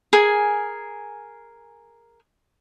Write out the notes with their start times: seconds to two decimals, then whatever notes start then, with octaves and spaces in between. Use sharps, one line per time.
0.13 G#4 A#4 G#5